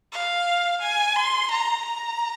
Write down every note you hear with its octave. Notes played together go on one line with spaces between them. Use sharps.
F5
G#5
C6
A#5
A#5